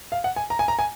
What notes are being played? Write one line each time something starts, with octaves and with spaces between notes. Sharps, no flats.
F5
F#5
G#5
A#5
G#5
A#5
G#5